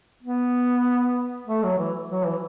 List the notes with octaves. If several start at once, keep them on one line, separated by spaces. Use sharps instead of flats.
B3
A3
F#3
E3
F#3
E3